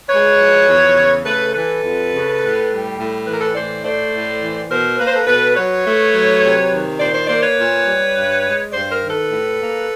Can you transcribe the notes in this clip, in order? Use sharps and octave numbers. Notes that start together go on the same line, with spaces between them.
G#3 B4 C#5
F3
E2
C#3
A3 A4 B4
E3 A4 B4
F2
C#3
A2
G3
A2
E3 B4
A#4
A4 B4
A2 C5 D5
A3 C5 D5
A2
E3
B2 A#4 C5
A#3 B4
C5
A4 B4
B2 A4 B4
F#3 B4 C#5
A3
F#3
C3
D#3
A#2 C5 D5
C5 D5
A#3 C5 D5
B4 C#5
A#2
G3
G2
G#3
G2 C5 D5
A#4 C5
D#3
A4 B4
A2
A#3